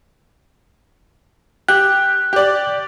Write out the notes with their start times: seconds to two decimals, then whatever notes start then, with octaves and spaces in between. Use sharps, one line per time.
1.69 G4 F#6
2.33 G4 D5